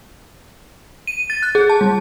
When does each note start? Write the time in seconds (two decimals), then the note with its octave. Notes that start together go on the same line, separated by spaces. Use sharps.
1.07 D#7
1.30 A6
1.43 F#6
1.55 G#4
1.70 A5
1.81 G3